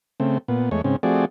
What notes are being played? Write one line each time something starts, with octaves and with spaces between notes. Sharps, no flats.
C#3 A3 C4
A#2 B3
E2 G#3 A3 C#5
G#2 C#3 C4 C#4
F3 A3 C4 F#4 G#4 D5